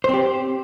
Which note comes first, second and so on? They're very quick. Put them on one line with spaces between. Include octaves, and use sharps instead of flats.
C5 C4 G4